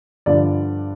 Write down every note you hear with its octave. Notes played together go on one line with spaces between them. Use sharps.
G2 D3 F3 D5